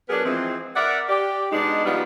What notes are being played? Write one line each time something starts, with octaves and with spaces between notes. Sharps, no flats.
F#3 B3 D4 G#4 A#4 B4
E3 F3 G#3 C4
A#4 D5 E5 F#5
G4 D5
B2 G#3 D4 D#4
F3 G3 B3 D#4 F4 F#4